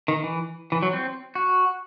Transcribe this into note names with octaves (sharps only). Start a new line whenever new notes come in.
D#3
E3
E3
F#3
C4
F#4